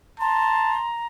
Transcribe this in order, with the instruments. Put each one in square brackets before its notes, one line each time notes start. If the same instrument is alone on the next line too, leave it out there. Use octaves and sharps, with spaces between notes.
[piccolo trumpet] A5 [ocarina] A#5 [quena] C6